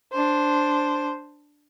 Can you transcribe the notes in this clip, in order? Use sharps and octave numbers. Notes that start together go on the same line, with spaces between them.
D4 C5